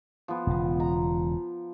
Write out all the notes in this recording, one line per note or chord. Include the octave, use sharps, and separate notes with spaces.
F3 B3
E1 C#3
A#5